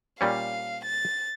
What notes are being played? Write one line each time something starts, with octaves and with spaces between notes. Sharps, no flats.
A#2 G3 C#4 F5
A6